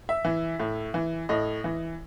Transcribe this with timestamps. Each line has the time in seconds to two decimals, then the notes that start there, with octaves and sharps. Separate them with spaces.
0.09 E5
0.25 E3
0.60 A2
0.94 E3
1.29 A2 D#5
1.64 E3